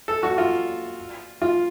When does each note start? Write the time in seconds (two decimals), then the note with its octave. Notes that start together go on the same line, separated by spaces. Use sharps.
0.08 A4
0.23 F#4
0.38 F4
1.42 F4